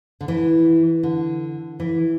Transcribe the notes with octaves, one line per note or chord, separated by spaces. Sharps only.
D3
E3
D3
E3